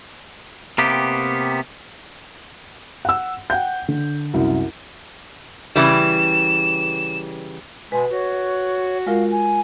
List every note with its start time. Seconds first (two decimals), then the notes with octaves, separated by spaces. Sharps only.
0.78 C3 A#3 B3 G4
3.05 F#5 E6
3.50 F#5 G5 G6
3.88 D3
4.34 C2 F#2
5.76 C#3 E3 G3 E7
7.92 B2 G#3 B4 G#5
8.11 F#4 C#5
9.07 G#3 F4 A#4 F5
9.31 G#5